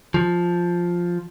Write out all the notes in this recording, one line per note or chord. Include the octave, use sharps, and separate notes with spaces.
F3